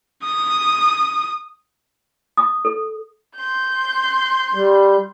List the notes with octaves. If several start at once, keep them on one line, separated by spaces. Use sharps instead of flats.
D#6
D#6
A4
C6 G6
G3